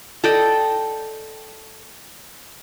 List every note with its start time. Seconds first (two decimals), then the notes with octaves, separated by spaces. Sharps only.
0.24 A4 D5 D#5 G5